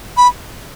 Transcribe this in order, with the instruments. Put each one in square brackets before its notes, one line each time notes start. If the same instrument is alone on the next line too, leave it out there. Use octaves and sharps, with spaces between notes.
[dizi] B5